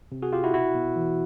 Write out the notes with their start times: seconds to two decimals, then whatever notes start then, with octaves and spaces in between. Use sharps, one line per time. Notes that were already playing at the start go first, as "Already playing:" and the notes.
0.12 C3
0.22 F#4 G#4
0.33 C3 F4 G4
0.43 E4 F#4
0.54 B2 E4 F#4
0.75 B2
0.96 E3